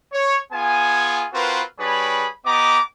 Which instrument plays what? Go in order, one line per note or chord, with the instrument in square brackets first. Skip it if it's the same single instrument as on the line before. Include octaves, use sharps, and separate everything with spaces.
[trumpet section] C#5
B3 F4 G#4 G#5
C4 F4 F#4 A#4 B4
G3 D4 G#4 B4 C#5 B5
B3 G4 D#5 A#5 D6